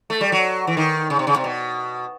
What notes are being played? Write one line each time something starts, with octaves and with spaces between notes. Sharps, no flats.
A3
G3
F#3
E3
D#3
C#3
C3
C#3
C3
B2